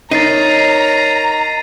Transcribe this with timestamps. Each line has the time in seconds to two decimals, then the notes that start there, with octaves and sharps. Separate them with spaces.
0.11 D#4 A#4 C#5 A#5 A6 C7 D#7